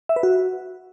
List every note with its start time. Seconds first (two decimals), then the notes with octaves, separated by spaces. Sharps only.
0.09 E5
0.16 B4
0.23 F#4